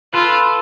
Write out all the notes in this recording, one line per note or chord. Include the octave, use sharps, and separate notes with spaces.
F4 A4 B4